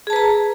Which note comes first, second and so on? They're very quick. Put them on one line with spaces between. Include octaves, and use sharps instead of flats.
G#4 A5 B4 A#5